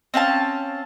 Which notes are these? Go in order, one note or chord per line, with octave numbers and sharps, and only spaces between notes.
C4 C#4 F5 A5